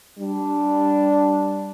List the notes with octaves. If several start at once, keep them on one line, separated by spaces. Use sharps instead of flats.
G3 D4